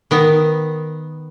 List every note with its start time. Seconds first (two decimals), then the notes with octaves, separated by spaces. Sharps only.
0.11 D#3 B3